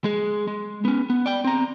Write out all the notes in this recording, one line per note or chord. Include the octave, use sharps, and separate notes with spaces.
G#3 G#4
G#3
B3 C#4
B3
D5 G5
C4 A#5